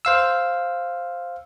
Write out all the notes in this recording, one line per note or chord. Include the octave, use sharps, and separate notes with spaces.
C5 F5 E6